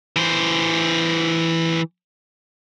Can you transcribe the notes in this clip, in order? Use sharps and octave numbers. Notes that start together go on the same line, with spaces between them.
E3 C5